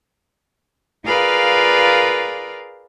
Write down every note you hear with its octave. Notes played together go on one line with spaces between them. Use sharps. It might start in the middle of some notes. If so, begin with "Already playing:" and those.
F4 G#4 A#4 B4 D5 F5